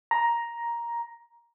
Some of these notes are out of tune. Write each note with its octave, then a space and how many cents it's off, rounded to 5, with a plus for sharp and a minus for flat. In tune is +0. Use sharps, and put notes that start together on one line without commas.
A#5 +10